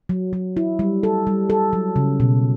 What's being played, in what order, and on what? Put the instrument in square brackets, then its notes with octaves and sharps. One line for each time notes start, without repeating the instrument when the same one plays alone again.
[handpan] F#3
F#3
E4
G3
A4
G3
A4
F#3
C#3
B2